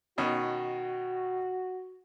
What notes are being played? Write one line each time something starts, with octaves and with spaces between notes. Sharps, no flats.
B2 D#3 C#4 F#4